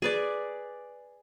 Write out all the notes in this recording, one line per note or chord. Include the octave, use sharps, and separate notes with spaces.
G#4 B4 D5